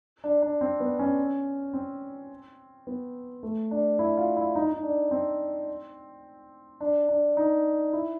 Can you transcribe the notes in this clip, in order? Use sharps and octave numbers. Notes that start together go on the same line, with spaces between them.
D4
D4
C4
B3
C#4
C4
B3
A3
D4
E4
F4
E4
D#4
D#4
D4
C4
D4
D4
D#4
E4